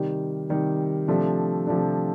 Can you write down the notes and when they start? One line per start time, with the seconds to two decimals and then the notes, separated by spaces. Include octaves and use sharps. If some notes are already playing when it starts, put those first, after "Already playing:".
Already playing: C3 D#3 G3
0.49 C3 D#3 G3
1.08 C3 F3 A3 D4
1.67 C3 F3 A3 D4